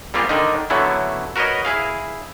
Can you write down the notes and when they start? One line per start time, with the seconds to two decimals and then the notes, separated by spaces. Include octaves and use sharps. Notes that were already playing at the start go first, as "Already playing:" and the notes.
0.14 G3 A#3 C4 F4 G4 G#4
0.29 D3 D#3 D4 D#4
0.70 D3 F#3 A3 B3 C#4 E4
1.36 F#4 A#4 B4 C#5 D#5
1.65 E4 G#4 F5